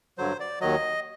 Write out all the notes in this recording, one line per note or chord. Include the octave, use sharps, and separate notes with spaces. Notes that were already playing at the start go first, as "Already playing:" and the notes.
G2 D3 F#3 C5
D5
D#2 D#3 F#3 D#5